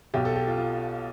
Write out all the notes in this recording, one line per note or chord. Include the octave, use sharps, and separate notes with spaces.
B1 B2 G4
A4
G4
F4
F4